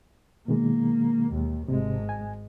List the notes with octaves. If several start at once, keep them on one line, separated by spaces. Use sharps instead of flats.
B2 D#3 G#3 A#3
D#2
G#1 C3 G#3
G#5